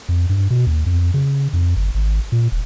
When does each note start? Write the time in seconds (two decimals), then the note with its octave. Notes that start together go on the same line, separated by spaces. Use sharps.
0.09 F2
0.29 G2
0.50 B2
0.67 D#2
0.86 F2
1.14 C#3
1.53 F2
1.76 G1
1.95 G#1
2.32 A#2
2.52 D#1